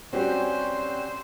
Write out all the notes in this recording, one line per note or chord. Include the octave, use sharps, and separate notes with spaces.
G3 C4 C#4 F#4 G4 C5